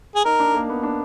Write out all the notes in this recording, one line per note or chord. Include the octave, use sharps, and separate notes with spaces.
G#4
D#4 A#4
D4
A#3
B3
D4